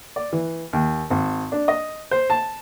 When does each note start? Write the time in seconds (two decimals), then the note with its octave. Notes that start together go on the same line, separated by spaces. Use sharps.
0.16 D5
0.32 E3
0.73 D#2
1.10 G#1
1.52 D4
1.68 D#5
2.11 C5
2.30 A5